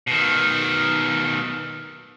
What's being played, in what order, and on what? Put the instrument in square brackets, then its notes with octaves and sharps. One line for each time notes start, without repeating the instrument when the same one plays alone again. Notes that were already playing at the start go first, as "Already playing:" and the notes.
[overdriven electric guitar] B2 D#3